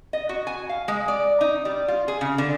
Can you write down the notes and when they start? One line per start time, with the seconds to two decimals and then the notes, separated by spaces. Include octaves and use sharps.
0.13 D#5
0.29 F#4
0.47 G#5
0.69 F5
0.88 G#3
1.08 D5
1.41 D#4
1.65 G3
1.88 F4
2.08 G#4
2.21 C#3
2.38 D3